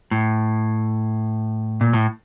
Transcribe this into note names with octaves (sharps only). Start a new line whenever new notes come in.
A2
A#2
A2